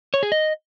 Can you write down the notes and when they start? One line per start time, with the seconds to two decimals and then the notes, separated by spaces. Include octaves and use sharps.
0.14 C#5
0.23 G#4
0.32 D#5